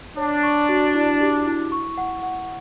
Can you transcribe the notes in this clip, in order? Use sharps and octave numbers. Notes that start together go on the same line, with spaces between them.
D4 C#5
C#6
F#4
E4
G4
E4
C#6
F#5
F#5